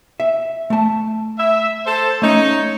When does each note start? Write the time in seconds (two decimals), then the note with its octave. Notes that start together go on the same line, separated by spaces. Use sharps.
0.20 E5
0.70 A3 A5
1.38 E5
1.86 A4 C5
2.22 A3 C#4 D#4 C#5